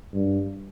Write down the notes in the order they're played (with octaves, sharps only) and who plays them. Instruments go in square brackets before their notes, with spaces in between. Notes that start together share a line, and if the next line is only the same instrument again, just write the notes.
[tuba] G2